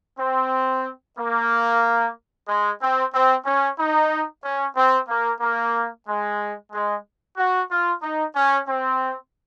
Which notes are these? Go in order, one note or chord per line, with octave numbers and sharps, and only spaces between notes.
C4
A#3
G#3
C4
C4
C#4
D#4
C#4
C4
A#3
A#3
G#3
G#3
F#4
F4
D#4
C#4
C4